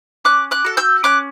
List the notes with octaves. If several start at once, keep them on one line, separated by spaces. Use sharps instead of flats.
C#4 D6 F#6
D6 F#6
F#4 A4
E6 G6
C#4 D6 F#6